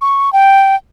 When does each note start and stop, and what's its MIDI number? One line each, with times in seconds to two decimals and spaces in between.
0.01 0.30 85
0.33 0.76 79